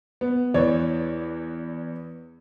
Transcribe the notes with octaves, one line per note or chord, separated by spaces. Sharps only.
B3
E2 E3 C#5 D5